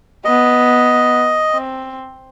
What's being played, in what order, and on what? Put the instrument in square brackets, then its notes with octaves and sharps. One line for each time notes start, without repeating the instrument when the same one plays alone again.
[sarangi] B3 [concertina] D#5
[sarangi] C4